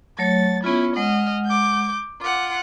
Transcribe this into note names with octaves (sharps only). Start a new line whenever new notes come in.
F#3 A3 C#5 A6
B3 C#4 E4 F4
G#3 D#5 F#5 F6
D6 G6
F4 F#5 D6